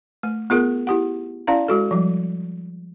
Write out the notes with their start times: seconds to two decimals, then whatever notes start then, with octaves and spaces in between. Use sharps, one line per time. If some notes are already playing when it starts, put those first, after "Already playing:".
0.23 A3
0.50 B3 F4 G#4 A#4
0.87 E4 G4 F#5
1.47 C#4 E4 D5 F5 A#5
1.68 G#3 F#4 A4
1.91 F3 G3